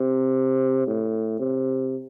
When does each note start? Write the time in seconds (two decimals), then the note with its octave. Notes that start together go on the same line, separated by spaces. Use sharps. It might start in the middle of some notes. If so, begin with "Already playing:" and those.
Already playing: C3
0.87 A2
1.40 C3